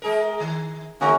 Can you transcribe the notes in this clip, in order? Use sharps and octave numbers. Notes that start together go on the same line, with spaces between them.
G#3 G#4 A#4
D#3
D3 G#3 A#3 C#4 F#4 A#4